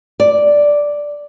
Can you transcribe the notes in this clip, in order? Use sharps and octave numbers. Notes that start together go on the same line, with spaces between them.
D5